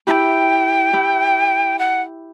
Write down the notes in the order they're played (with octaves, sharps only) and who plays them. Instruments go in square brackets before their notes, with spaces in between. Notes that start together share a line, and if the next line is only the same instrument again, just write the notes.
[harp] E4 G4 [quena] G5 B5
[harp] E4 G4
[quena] F#5